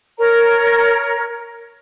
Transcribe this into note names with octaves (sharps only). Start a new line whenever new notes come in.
A#4 C#5 A#5